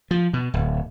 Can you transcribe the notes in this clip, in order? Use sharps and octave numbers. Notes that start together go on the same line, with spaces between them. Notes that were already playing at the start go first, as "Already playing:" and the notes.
F3
B2
D1